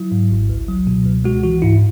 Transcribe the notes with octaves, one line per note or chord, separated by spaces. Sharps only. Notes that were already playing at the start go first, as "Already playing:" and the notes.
Already playing: F#3 E4
G#2
G#1
C#2
F#3
B2
C#2
G#3 F#4
E3 F#4
G#2 E4